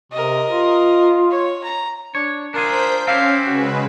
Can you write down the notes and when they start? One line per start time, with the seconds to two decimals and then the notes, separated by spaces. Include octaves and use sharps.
0.12 C3 A#4 D#5
0.50 F4
1.31 C#5
1.64 A#5
2.15 D4 C#5
2.54 D4 F4 G#4 A#4 C5 G6 B6
3.07 C4 C#4 E4 G4 F5
3.47 C#3 G#3 F#4 B4